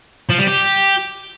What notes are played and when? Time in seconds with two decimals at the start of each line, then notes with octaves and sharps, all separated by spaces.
0.30 F3
0.39 G3
0.48 G4